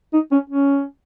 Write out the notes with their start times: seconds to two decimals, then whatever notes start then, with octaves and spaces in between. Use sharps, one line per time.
0.13 D#4
0.32 C#4
0.50 C#4